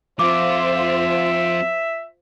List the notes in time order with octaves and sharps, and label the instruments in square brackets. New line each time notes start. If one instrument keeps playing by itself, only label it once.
[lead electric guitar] F3 C4 [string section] F4 C5 [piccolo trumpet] E5 [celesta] D6